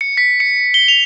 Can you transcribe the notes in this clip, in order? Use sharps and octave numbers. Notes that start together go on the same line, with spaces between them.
C#7
B6
C#7
G7
F7